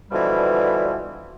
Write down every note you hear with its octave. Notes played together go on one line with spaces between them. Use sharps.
B2 D3 E3 F3 G3